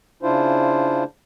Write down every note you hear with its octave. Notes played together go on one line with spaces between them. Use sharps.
C#3 D4 E4 F4 C5